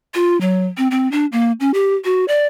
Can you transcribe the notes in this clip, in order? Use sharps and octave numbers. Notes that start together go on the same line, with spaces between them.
F4
F#3
C4
C4
D4
A#3
C#4
G4
F#4
D5